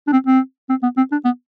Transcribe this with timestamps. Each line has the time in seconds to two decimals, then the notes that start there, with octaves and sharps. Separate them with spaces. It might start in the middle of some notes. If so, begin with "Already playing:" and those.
0.07 D4
0.12 C4
0.27 C4
0.70 C4
0.83 B3
0.97 C4
1.12 D4
1.25 B3